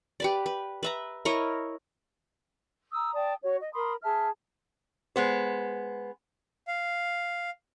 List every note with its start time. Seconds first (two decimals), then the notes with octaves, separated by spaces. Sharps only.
0.20 G4 B4 D5
0.46 B4
0.83 B4 E5 A#5
1.25 E4 A#4 C#5 D#5
2.92 A#5 D#6 E6
3.13 D5 G5 A5 D#6
3.41 F#4 C#5
3.61 D#5
3.73 A#4 B5 C6 D#6
4.02 G#4 E5 A5 F6
5.16 G#3 B3 C5
6.67 F5